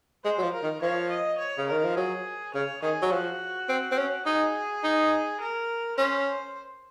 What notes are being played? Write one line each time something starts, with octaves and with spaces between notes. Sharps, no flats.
G#3 C5
F#3
F3
A#4
D#3
F3 C#5
D#5
C#5
C#3
D#3 A#4
F3
F#3 G#4
C#3 C#5
D#3 G#4
F#3
F3 F#4
C4
C4
C#4
D#4 G#4
D#4
A#4
C#4 C5